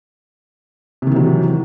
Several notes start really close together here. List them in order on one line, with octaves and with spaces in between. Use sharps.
C3 D#3 E3 F#3